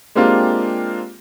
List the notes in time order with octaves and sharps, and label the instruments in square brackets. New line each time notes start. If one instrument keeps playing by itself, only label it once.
[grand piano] G#3 A#3 C4 D4 F4 G4